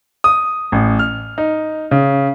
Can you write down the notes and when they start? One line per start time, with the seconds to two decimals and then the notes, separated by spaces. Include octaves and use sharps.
0.24 D#6
0.72 A1
0.99 F6
1.38 D#4
1.91 C#3